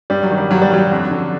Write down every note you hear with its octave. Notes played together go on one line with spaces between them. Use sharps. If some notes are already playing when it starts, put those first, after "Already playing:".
G2 G3
F#3
D#3
G3
G2 F#3
G3
D#3 F#3
F2
D3